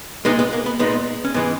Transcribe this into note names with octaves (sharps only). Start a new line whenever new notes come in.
A#2 G#3 B3 D#4
B3
A#3
B3
A#2 G#3 B3 D#4
C#4
G#2 E3 G#3 B3